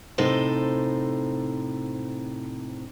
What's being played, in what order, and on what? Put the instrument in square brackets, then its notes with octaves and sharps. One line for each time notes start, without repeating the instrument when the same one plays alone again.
[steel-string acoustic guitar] A2 C3 D#4 A4 C5